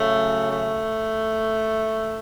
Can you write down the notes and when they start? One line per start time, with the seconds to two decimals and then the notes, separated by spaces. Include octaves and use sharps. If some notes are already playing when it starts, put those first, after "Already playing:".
Already playing: C#3 F#3 A3
0.50 A3